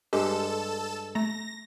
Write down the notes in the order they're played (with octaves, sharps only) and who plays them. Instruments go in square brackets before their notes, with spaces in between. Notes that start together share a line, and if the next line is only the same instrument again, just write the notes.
[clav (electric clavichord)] G2 G#3 [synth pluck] G4 [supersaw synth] A4 E7
[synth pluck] A3 A#5 [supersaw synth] A#6